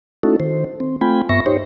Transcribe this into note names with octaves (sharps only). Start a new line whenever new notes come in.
A3 C#4 D#4 E4 F#4 A4
D#3 C5
C4
A3 C4 F4 G5 G#5 B5
G2 B3 E5 C#6 A#6
D#4 G4 C5 C#5